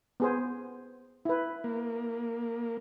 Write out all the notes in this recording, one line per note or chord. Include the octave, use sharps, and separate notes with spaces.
B3 G#4 C5
E4 B4
A#3